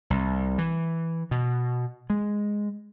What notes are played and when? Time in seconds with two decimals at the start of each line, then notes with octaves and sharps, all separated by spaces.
0.10 C2
0.58 E3
1.31 B2
2.10 G#3